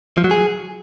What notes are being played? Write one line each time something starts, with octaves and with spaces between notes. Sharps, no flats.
F3
F#3
G#4